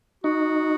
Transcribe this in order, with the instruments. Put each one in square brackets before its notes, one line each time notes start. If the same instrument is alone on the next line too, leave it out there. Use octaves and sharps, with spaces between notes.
[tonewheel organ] D#4 [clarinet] F#4